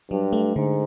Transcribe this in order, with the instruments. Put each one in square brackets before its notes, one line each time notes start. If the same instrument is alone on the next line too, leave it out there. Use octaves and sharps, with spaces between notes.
[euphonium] G2 [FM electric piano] F#3
[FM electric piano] A3
[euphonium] G#2 [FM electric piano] D3